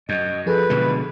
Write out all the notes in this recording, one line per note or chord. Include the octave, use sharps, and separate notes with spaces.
F#2 D#5
F3 G#4 A4 B4
B2 D3 G#3